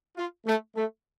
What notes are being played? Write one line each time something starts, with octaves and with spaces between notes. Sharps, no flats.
F4
A3
A3